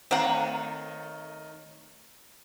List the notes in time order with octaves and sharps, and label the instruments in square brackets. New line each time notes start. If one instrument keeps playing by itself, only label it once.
[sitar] D#3 A3 C#5 [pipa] C4 F#5